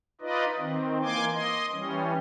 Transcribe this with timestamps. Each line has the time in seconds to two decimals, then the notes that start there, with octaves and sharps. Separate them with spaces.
0.21 D#4 F4 B4 D5 D#5
0.58 D#3 C4
1.03 E3 A#3 G#5 C6 D6
1.33 D#5 C6
1.72 E3 G3 C#4